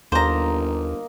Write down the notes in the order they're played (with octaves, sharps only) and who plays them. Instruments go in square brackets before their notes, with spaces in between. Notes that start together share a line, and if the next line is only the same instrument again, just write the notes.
[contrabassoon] G1 [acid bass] D#2 [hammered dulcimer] A#3 D#5 [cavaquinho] C5 A#5